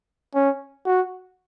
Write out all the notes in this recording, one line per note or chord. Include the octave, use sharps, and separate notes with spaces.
C#4
F#4